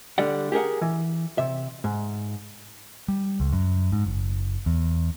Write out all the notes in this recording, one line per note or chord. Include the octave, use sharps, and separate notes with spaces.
D3 G3 D5 F#5
G4 G#4 A#4 F#5
E3
C3 E5
G#2
G3
C#2
F#2
G#2
F#1
E2